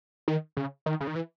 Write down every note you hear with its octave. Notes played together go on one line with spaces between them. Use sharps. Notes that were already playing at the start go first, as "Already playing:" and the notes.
D#3
C#3
D#3
C#3
D#3
E3